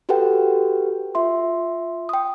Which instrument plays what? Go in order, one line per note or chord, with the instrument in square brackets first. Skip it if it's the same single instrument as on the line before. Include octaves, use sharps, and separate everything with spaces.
[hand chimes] F#4 G4 A4 B4 F#5 G5
F4 E5 C6
G5 D#6